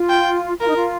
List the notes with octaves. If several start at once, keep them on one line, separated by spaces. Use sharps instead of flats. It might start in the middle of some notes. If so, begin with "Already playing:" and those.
Already playing: F4
G5
F4 A#4
D#4
F4